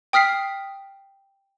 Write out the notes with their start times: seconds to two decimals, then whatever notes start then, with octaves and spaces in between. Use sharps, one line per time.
0.13 G5 D#6 F6 B6 C7